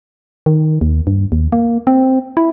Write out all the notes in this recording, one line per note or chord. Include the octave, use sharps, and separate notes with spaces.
D#3
D#2
G2
D#2
A#3
C4
E4